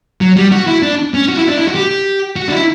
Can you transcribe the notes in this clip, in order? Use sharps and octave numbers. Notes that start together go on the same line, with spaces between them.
F#3
G3
F#4
E4
D4
C#4
F#4
E4
D4
E4
F#4
G4
F#4
D4
E4